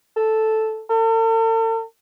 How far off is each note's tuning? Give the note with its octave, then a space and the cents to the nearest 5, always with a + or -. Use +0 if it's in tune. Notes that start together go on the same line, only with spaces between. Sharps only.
A4 -5
A4 +45